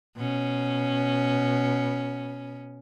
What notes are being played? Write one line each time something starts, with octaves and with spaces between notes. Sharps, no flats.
B2 C#4